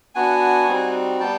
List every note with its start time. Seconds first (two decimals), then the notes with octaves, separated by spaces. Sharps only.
0.15 B3 D4 F#4 F#5 G#5
0.68 G3 C4 D#4 F#4
1.20 G3 B3 G5 A5